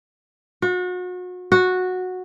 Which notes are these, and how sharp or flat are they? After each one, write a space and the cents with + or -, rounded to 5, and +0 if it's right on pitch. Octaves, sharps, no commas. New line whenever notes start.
F#4 -35
F#4 -10